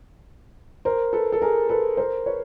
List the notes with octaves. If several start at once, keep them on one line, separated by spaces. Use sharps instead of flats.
A#4 C5
A4 B4
A4
G#4 A#4
A4 B4
A#4 C5
B4 C#5